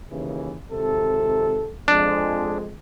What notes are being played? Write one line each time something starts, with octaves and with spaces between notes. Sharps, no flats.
D#2 C#3 E3
G#1 C3 A4
F2 G#3 D4